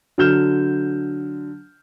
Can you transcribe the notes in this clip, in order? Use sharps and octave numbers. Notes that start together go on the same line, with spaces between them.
D3 F#3 F6 G6 E7